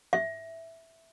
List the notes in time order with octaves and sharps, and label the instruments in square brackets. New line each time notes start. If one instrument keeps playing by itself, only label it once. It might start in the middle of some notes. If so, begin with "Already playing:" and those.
[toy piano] E5